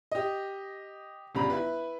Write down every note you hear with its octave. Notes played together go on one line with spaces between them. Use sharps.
G4 D#5
G1 C#3 G3 A#5 B5
E4 B4